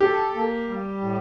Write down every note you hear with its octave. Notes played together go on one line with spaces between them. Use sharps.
G4 A4
A#3
G3
A2